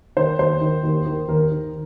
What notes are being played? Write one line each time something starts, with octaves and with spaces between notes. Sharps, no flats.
D#3 C5
D#2 C5
D#3
D#2
D#3
D#2 A#4
D#3